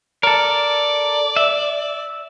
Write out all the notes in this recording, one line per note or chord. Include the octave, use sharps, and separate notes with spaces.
A4 A#4 D5
E5